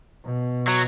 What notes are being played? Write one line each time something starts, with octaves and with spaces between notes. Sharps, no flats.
B2
F#3